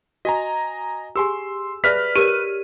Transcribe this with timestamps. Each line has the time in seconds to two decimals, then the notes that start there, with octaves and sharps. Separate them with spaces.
0.25 F#4 D#5 G#5 A#5
1.16 G4 G#4 G#5 C6 E6
1.84 G#4 B4 D5 E5 F6 B6
2.16 G4 A#4 C#5 D#7